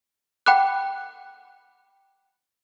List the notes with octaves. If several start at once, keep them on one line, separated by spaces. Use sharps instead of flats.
F#5 G5 B5 D6 F#6